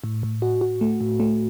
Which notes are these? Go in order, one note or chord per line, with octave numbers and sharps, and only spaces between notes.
A2
A2
F#4
F#4
A3
A2
A3